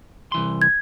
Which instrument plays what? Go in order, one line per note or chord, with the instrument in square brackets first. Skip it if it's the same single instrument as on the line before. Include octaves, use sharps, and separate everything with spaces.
[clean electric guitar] C2 E3 C6
[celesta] G#6